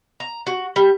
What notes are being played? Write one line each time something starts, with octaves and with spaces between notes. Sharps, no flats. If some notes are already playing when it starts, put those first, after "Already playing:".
A#5
F#4
G3